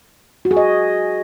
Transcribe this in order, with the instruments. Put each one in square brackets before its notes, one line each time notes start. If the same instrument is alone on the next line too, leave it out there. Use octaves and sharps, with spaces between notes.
[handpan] F#4
G#4
D#5